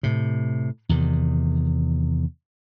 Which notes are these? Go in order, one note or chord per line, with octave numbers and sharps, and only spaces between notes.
A2 C3
E2 C3 D#3